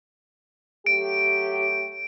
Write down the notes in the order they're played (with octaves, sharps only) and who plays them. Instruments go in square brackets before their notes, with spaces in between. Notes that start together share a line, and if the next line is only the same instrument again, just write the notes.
[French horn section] F#3 A3 G4 [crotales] D7